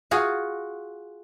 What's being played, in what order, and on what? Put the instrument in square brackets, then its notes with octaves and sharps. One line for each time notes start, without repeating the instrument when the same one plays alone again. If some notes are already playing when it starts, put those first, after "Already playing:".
[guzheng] F4 F#4 G#4